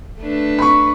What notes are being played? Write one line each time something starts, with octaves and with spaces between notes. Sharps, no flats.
A3 D4 B4
B5 C#6